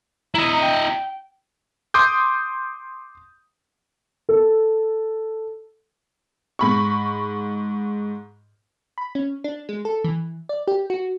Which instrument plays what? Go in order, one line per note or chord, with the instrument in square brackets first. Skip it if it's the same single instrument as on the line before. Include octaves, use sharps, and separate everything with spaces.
[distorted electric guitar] E4 D#5 [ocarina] A#5
[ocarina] G5
[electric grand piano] C6 D6 D#6 G6
[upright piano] A4
[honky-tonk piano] G#2 B5 C#6
[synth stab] B5
C#4
D4
G#3
A4
E3
D5
G4
F#4